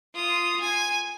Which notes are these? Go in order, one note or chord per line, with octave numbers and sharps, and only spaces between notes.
F4 D#6
G#5